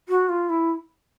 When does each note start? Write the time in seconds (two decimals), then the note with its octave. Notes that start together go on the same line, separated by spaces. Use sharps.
0.09 F#4
0.29 F4
0.49 E4